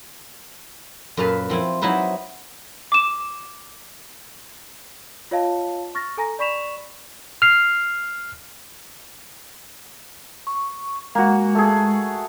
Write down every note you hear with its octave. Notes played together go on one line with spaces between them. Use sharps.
F#2 A#2 B4 F5 A5
F3 C4 E4
F#3 D#4 E4 B4 C5
D6 E7
F4 C#5 D#5 F5 A5
C#6 F6 A6 A#6
A4 G#5 A#5 A#6
D5 B5 C#6 B6 E7 F7
F6 C7
C#6
G#3 A#3 F#4
A3 G#4